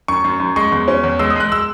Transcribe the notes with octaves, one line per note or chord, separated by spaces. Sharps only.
F#2 C#6
F#2
F#2
G#3 C#6
E2
C#4
E2
G#3 E6
D#6
G#3 F#6
E6